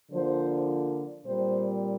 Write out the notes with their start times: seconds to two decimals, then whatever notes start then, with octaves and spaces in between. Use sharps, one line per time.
0.11 D3 F3 A#3 C5
1.25 A#2 G3 C4 C5